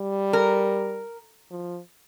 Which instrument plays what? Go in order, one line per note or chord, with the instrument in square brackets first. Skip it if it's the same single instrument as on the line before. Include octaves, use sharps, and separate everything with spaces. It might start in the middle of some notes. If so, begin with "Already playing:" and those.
Already playing: [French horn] G3
[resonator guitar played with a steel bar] A#4
[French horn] F3